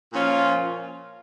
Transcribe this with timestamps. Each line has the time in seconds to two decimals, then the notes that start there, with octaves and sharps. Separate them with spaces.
0.12 A#2 F3 C#4 F4